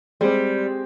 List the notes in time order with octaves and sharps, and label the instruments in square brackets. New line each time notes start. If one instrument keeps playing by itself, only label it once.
[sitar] G3 [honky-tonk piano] G#3 C4